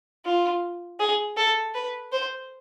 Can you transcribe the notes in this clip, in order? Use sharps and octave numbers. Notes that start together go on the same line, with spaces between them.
F4
G#4
A4
B4
C5